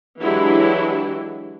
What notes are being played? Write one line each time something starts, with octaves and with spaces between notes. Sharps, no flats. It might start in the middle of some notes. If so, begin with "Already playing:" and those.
E3 F#3 G#3 D4 E4 G4